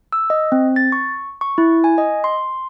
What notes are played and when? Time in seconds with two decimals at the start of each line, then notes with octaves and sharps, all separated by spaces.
0.13 E6
0.30 D#5
0.52 C4
0.76 A6
0.92 C#6
1.41 C#6
1.58 E4
1.84 G#5
1.98 D#5
2.24 C6